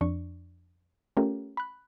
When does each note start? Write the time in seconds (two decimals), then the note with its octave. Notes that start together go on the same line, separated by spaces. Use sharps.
0.01 F2 D4 C#6
1.17 A3 C#4 F4 G4 A#4
1.57 B5 F#6